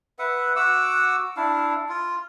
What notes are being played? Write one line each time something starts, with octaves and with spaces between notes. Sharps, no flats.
B4 E5 F#5
F#4 F#5 D6 E6
D4 E4 F5
F4